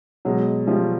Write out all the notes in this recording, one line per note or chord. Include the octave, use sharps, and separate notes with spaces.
B2 F#3 G#3
F3 G3